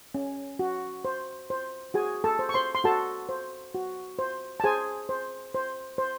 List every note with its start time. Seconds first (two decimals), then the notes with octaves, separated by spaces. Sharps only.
0.15 C#4
0.59 F#4
1.05 C5
1.50 C5
1.94 F#4 G#4 G#5
2.24 A4 A5
2.39 C5
2.49 C#6
2.54 C5 C6
2.75 C6
2.84 F#4 A4 A5
3.29 C5
3.75 F#4
4.19 C5
4.60 A5
4.64 G#4 C5 G#5
5.09 C5
5.55 C5
5.98 C5